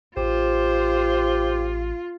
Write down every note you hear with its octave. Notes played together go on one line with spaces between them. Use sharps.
A1 F4 G4 C5